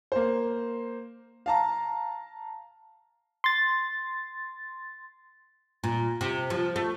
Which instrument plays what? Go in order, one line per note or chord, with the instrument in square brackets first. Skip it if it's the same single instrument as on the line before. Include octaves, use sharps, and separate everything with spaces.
[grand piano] A#3 C5
F5 A5 A#5
[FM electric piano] C6 A6
[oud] A#2
C3
F3
A3